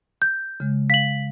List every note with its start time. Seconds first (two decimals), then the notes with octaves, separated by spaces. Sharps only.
0.22 G6
0.60 C#3 G#3
0.90 F5 B6 F#7